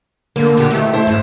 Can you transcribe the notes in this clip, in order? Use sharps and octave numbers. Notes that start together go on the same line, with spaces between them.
D3 A#3
A#2 D3 F#4 G4
E2 D#3 A3
E4 C5 E5
G#2